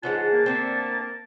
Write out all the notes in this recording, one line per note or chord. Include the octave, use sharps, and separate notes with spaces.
G#2 C#3 E3 G#3 F4 F#5 A5
A#3
D3 A3 C4